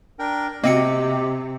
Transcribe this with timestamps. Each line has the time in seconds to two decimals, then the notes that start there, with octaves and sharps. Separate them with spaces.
0.19 D4 A#4 G5
0.64 C3 A#3 C4 F#4 G4 D#5 C#7